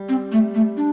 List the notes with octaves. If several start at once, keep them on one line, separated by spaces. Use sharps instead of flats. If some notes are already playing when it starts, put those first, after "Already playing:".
Already playing: G3
C4
A3
A3
D4